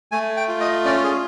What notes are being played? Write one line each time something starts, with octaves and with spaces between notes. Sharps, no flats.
A3 G#5
G5
F4
D#5
C#4 D5
G#4